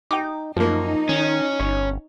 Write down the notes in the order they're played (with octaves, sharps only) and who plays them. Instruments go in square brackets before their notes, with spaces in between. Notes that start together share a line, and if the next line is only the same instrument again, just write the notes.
[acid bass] D#4 [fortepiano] G5 D6
[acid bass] F#2 [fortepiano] F3 A#3 [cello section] D#4
[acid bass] D#3 [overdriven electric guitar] C#4
[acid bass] G1 [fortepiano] C#5